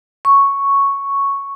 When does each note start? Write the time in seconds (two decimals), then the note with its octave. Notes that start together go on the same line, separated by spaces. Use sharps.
0.25 C#6